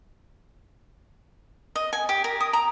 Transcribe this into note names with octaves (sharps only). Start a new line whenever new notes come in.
D#5
G#5
G4
A#4
D#6
A#5